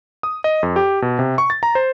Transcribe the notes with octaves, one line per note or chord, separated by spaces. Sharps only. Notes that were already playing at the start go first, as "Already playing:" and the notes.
D#6
D#5
F2
G4
B2
C3
C#6
A6
A#5
C5